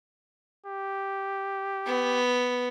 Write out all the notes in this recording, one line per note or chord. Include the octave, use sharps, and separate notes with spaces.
G4
B3